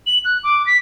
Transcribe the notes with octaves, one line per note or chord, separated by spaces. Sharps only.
F#7
F#6
D6
B6